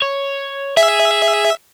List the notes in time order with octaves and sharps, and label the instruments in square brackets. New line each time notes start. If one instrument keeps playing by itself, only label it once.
[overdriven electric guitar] C#5
[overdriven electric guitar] G#4 [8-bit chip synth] E5